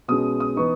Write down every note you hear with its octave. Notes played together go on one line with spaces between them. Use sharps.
B2 G#3 C#4 D#6
D#6
E3 B3 D#4 C#6